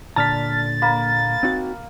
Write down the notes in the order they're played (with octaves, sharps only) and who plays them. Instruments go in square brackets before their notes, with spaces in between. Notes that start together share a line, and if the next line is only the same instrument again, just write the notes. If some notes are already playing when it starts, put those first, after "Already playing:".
[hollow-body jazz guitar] A#2 D3 A#5 [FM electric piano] A5 F6 B6 [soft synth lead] A6
[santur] A#3 [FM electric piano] B5
[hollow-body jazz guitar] C4 D#4 F#4